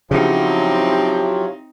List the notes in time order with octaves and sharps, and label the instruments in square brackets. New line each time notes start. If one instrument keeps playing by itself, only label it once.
[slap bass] C#3 [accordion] F3 F#3 [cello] C4 D#4 [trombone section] E4 G4